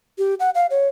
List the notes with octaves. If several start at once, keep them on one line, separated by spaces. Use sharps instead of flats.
G4
F#5
F5
C#5